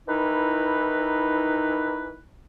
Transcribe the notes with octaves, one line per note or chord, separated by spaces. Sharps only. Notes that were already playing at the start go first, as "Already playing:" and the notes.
D#3 E3 D#4 E4 B4